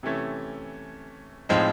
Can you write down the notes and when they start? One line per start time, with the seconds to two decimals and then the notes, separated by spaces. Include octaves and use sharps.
0.03 C3 E3 A3 C#4
1.49 A2 F3 G#3 C4 D#4